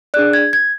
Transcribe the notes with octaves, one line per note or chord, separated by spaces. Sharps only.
D4 G#4 D5 F#6
G#6
G#6